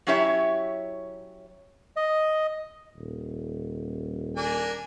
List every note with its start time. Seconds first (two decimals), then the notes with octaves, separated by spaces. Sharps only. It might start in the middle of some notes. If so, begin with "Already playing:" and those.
0.07 F#3 C#4 E4 G4 C#5 E5
1.96 D#5
2.95 D#1
4.37 A#3 D4 G#5